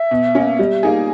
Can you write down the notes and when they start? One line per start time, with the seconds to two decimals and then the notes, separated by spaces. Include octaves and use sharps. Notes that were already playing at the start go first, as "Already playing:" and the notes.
Already playing: E5
0.11 B2
0.35 A#3 C#4
0.59 G3
0.83 A#3 D#4 G#4